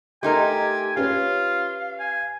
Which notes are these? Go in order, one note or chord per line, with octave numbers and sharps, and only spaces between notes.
A3 D#4 G4 A#4 G#5 C6
C#4 F4 G4 B4 C#5 F5
G#5